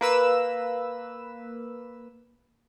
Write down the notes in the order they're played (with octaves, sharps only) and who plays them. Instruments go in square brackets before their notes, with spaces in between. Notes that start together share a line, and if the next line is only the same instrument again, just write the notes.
[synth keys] A#3 B4 E6 E7